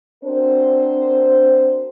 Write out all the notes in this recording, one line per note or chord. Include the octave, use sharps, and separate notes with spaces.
C4 D4 F#4 A#4 C5